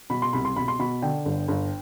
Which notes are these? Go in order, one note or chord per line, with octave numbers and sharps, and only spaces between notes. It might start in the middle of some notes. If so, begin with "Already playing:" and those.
B2 B5
C6
C2 B5
C6
B2 B5
C6
B2 B5
D3 G5
G1
G1